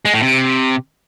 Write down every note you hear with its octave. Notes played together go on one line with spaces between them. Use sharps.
G#3
A2
C3